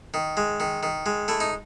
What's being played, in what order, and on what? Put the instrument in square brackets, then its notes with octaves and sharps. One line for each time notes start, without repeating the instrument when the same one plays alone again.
[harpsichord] D#3
G#3
D#3
D#3
G#3
A3 E4
D#4